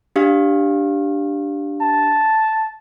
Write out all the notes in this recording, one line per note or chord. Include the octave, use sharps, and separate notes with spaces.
D4 G4 F5
A5